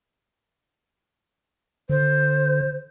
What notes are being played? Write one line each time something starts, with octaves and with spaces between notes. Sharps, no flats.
D3 C5